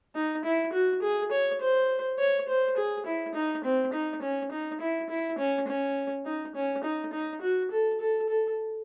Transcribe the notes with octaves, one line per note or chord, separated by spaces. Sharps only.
D#4
E4
F#4
G#4
C#5
C5
C#5
C5
G#4
E4
D#4
C4
D#4
C#4
D#4
E4
E4
C#4
C#4
D#4
C#4
D#4
D#4
F#4
A4
A4
A4